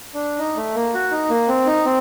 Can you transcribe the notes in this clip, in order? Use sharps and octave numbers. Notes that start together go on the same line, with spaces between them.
D4
D#4
A3
A#3
F#4
D#4
A#3
C4
D#4
C4